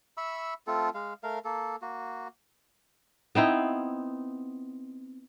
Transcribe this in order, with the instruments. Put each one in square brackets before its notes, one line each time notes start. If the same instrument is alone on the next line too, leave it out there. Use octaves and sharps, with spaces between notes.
[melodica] E5 B5 C#6 E6
A3 C4 F4 A4
G#3 F5
A3 A#4 F5
A#3 A4
A#3 F#4
[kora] B3 C4 D#4 E4